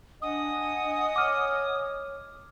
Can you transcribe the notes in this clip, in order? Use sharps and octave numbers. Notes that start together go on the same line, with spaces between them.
D4 D#5 F#5 G#5 D#6
C#5 D6 F6